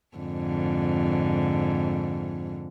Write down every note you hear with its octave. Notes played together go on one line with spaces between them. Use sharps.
F2 G#2 D3